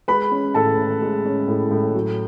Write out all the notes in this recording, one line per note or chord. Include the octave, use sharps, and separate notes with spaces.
G#3 B4 B5
C#4
A2 A4 A5
A2
G#3
C#4
A2
A2
F#3